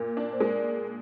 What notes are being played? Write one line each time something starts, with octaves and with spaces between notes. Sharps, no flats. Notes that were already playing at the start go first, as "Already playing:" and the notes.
Already playing: A#2 A#4
D4
C5
G#3 A#4 D5